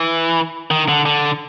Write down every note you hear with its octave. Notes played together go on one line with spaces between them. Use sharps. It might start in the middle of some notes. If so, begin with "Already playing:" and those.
Already playing: E3
D#3
D3
D3